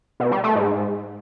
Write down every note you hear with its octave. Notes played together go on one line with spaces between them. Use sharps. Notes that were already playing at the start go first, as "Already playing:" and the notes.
B2
G3
A3
G#2